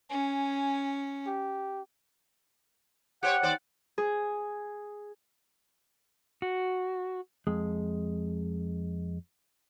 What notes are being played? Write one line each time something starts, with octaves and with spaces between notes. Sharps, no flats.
C#4 G#5
G4
G4 C5 C#5 F#5
D#2 C5 D5
G#4
F#4
F2 G#3